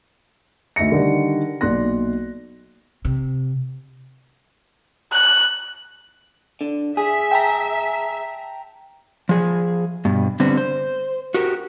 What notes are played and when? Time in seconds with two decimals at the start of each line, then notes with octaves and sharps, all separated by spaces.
0.76 D2 D#4 E5 A#6 C#7
0.92 D3 D#3 G3
1.61 B1 A#2 D5 C6 F#6 A#6
3.05 C3
5.13 F#6
6.61 D3
6.97 G#4 E5
7.31 G5 A5 A#5
9.29 F3 G#4
10.05 G2 B2
10.40 D3 G3 B3 C4
10.58 C5
11.34 F#4 G4 A#4